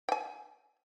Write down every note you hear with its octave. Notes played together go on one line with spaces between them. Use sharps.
G5 G#5